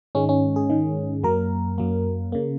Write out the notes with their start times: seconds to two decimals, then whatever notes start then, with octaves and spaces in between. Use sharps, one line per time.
0.15 G#2 D#3 G#3 C#4
0.29 C#4
0.56 G#4
0.70 G#2 D#3 G#3
1.23 F#2 F#3 A#3 A#4
1.78 F#2 F#3 A#3
2.32 C#3 A#3